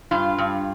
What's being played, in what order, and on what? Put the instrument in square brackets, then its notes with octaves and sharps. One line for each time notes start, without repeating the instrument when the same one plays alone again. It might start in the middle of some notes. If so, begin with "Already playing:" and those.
[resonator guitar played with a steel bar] G2 F4
G2